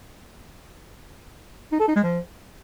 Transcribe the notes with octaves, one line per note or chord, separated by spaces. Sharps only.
D#4
A4
D#4
G#3
F3